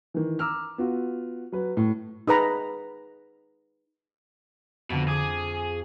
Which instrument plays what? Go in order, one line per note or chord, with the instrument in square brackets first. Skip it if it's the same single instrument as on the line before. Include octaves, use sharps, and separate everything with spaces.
[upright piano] D#3 E3
A#5 D6 E6 F6
B3 F4 F#4
F#3 B4
A2
[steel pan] D#4 G#4 B4 A#5 B5
[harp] F2 D3 [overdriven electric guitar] B2
[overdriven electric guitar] G#4 [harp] D6 D#6